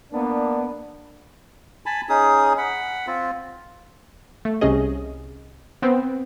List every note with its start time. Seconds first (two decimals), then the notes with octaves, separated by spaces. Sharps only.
0.12 A#3 B3 D4
1.86 G#5 A5 B5
2.09 C#4 D#4 G#4 D#6
2.58 F#5 B5
3.07 C4 F4
4.45 A3
4.61 C2 C3 C#4 G#4 D#5
5.82 B3 C4